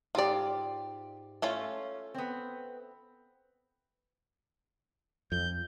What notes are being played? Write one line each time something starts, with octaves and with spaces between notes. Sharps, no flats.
G#2 F4 G4 D5
A3 C#4 F4
B3 C4
F2 G6